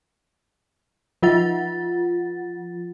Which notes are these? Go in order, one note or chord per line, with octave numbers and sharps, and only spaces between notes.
F3 F4 F#5 A6